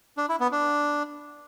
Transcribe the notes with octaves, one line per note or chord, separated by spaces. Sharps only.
D4
E4
B3
D4